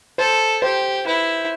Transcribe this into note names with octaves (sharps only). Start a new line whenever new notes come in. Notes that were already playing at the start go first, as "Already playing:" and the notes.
A4 C5
G4 C5
E4 B4